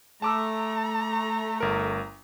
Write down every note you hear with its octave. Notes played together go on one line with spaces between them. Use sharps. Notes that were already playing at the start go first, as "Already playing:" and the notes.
A3 A5 A#5 D6 E6
G1 A#4